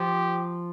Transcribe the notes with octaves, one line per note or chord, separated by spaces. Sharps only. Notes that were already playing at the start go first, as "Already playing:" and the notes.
Already playing: F3 G4